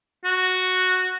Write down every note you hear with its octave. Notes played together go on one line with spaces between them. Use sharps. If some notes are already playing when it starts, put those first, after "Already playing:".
F#4